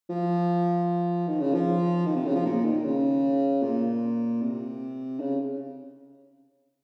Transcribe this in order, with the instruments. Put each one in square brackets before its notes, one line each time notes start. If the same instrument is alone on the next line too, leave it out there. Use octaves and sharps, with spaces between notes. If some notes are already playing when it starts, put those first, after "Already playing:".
[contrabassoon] F3
D#3
C#3
F3
D#3
C3
C#3
F3
A#2
D#3
C#3
A#2
C3
C#3